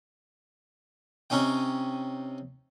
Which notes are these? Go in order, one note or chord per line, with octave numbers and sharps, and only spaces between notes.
C3 C#4 D#4 G5